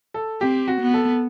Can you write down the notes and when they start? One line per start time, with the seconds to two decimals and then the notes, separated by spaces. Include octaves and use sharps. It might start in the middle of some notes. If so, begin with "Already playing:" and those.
0.14 A4
0.41 C4 G4
0.68 F#4
0.81 B3
0.94 A4